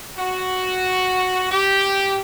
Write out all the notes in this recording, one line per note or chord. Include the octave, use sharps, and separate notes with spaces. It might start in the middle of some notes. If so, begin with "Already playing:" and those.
F#4
G4